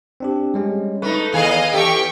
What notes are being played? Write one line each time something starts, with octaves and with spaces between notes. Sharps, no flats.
C4 D4 G4
G3 G#3 C#4
A3 D#4 B4
D#2 G#4 D#5 F5
E2 G4 A4 G5 C#6